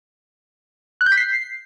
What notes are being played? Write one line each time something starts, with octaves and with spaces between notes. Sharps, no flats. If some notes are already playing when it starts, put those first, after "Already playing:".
F#6
G6
B6
C7